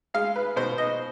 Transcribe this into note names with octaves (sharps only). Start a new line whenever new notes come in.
G#3 F5
B4
B2 C5
D#5